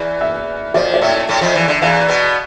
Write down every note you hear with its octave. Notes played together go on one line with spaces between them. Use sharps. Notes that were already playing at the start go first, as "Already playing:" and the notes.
Already playing: E2 E3
E5
F2 F3 D5
D5
A2 A3 E5
A2 A3 E5
F2 F3
E2 E3
D3
E2 E3 F5
B2 B3